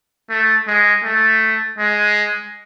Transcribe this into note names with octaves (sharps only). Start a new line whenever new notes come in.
A3
G#3
A3
G#3